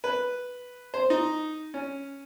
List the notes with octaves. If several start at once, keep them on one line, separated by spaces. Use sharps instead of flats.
B4
C5
D#4
C#4